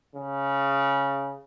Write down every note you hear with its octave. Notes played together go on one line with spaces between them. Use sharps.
C#3